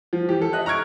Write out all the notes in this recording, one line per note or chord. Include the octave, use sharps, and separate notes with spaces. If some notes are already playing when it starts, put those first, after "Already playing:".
F3
E3 G4
A4
D#5 E5 F#6
A#5 C#6 F6 G#6 D7